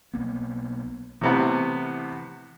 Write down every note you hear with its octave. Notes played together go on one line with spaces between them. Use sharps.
B1 A#3 B3
A2 C3 E3 B3